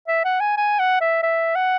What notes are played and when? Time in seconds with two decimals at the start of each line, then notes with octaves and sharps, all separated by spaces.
0.08 E5
0.25 F#5
0.41 G#5
0.57 G#5
0.80 F#5
1.01 E5
1.23 E5
1.55 F#5